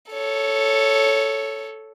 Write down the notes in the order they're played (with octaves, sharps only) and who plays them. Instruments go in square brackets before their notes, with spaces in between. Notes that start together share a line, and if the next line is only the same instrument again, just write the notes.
[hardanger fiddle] A4 C#5